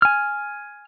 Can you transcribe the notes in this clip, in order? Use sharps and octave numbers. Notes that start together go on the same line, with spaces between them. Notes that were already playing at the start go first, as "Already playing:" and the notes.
G#5 F6